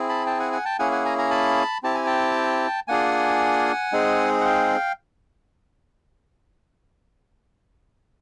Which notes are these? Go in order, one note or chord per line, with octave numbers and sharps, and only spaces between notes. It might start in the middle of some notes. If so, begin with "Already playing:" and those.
Already playing: C4 E4 G#4
A5 B5
G5 A5
F#5 G#5
F#5 G#5
G5 A5
A#3 C#4 E4 G#4 F#5 G#5
F#5 G#5
G#5 A#5
G#5 A#5
A5 B5
C4 E4 G4 A5
G#5
G5 A5
A#3 D4 F4 G#4 F#5 G#5
G#3 C4 D#4 G#4
F#5
F5 G5